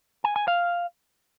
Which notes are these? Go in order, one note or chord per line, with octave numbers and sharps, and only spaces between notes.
G#5
G#5
F5